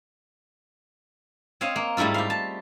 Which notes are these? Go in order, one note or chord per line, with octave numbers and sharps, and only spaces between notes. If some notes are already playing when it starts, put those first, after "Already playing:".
C4 C#5 D#5 F5
A#3
G#2 G3 A3 E4 F4
G4 F5
A5